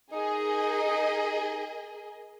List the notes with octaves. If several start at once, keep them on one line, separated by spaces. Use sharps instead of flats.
D#4 G#4 A#4 D#5